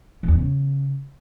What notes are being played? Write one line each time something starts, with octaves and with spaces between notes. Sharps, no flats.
F#2
E2
A2
C#3